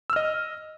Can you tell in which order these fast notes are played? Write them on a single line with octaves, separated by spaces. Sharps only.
E6 F6 D#5